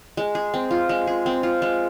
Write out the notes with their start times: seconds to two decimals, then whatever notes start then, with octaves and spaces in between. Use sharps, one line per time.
0.17 G#3
0.35 G#4
0.54 C4
0.71 F4
0.89 G#3
1.07 G#4
1.26 C4
1.43 F4
1.62 G#3